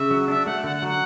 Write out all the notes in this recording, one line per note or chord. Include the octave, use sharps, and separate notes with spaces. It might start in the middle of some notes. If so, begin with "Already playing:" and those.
Already playing: C#3 E5
F#3
D4 E5
A3 F#5
D3 F#5
F#5
F#3
F#5